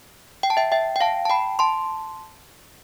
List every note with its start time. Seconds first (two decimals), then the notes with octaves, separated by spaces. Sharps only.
0.43 G5
0.50 A5
0.57 E5 G5
0.72 E5 G5
0.96 G5
1.01 F5 A5
1.25 A5
1.30 G5 B5
1.59 A5 C6